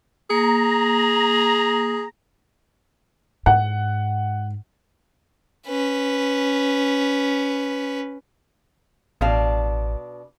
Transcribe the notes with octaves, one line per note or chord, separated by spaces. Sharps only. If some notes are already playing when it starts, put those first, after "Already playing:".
A#3 G#4 A#5
G#2 F#5
C#4 B4
A1 B2 D4 F5